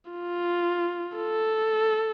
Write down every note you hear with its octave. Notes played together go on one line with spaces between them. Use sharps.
F4
A4